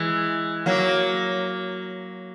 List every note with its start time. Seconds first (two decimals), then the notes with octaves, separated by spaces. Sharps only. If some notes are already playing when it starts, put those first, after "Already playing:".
Already playing: E3 G#3
0.66 F#3 A#3